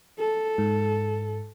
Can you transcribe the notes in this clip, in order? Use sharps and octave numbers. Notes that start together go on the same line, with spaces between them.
A4
G#2